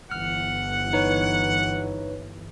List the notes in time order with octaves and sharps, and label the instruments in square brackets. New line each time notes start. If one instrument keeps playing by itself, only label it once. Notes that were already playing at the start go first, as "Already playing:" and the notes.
[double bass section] G1 E3 [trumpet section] F#5 [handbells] F6
[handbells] D#4 B4 C#5